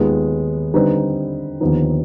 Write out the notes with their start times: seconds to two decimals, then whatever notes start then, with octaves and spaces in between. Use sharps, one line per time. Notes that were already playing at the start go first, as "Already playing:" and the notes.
Already playing: D#2 D#3 G#3 B3 F4
0.74 D3 G3 C4 D#4 B4
1.60 D#2 D3 F3 B3 D#4